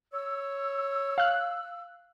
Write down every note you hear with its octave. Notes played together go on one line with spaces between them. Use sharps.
C#5 E6
F5 F#6